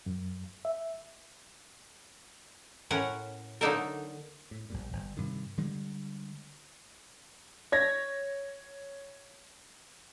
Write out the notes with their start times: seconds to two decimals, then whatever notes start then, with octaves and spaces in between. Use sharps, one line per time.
0.06 F#2
0.65 E5
2.91 A2 C#4 A#4 F#5
3.61 D3 F#3 A#3 D#4 A4 A#4
4.51 A2
4.70 A#1 G2 A#2
4.93 G1
5.17 G2 C3 D#3
5.57 D3 G3 G#3
7.72 C#5 G#6 A#6